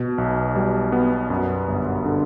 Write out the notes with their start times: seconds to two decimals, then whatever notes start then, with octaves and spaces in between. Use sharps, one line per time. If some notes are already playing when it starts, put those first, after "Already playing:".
Already playing: B2
0.18 B1
0.55 G3
0.92 B3
1.30 F#2
1.68 G1
2.05 D3